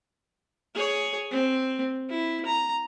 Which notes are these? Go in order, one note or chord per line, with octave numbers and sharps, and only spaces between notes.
G#4 C#5
C4
E4
A#5